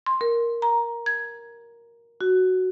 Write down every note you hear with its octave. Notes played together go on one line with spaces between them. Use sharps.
C6
A#4
A#5
G#6
F#4